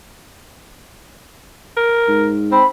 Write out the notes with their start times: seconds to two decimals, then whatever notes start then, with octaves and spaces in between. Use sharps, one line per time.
1.77 A#4
2.08 G#2
2.52 C4 B5